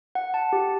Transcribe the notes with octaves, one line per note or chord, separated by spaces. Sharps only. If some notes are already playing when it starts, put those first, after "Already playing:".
F#5
A5
G4